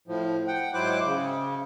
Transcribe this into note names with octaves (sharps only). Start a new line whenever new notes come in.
A2 F3
F#5 G5
G#2 F#3 E4 C5 D6 F#6
C#3